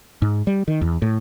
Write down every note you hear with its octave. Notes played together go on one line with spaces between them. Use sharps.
G#2
G3
D#3
E2
A2